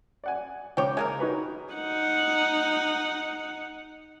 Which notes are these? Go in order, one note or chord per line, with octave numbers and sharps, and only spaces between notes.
D5 F#5 G#5
C#2 C#5 G5 D6
G#3 A#3 A#4 G#5
D#4 F#4 B4
D#4 F#5